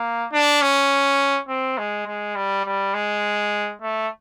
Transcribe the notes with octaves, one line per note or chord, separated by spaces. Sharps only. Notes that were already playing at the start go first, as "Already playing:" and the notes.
Already playing: A#3
D4
C#4
C4
G#3
G#3
G3
G3
G#3
A3